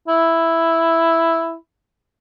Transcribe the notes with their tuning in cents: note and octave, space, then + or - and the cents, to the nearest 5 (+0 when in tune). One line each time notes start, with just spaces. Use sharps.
E4 +0